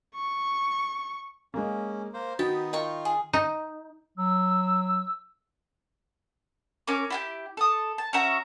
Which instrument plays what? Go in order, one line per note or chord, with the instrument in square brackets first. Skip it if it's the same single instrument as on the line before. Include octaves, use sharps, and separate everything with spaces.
[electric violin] C#6
[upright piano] G#3 A#3 [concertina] C#4
[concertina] A#3 C5
[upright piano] D#3 [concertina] B3 D#4 [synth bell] F#4 A6 [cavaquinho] G5
[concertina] F4 [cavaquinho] A#4 G5 C#6 [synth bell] D#5
[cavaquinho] G#4
[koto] D#4
[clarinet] F#3 [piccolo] E6
[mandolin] C#4 A#4 D6
E4 F4 G4
A4 D#6
A5
C#4 F#4 E5 A#5